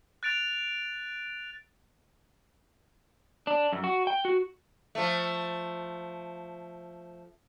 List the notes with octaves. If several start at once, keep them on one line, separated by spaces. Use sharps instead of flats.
F#6 A6 D7 F7
D4
F#2
F#4
G5
F#4
F3 A3